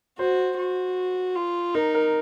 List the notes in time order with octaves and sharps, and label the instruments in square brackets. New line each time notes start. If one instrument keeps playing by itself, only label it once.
[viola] F#4 [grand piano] C5
[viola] F#4
F4
[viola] D#4 [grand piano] A#4
[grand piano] A#4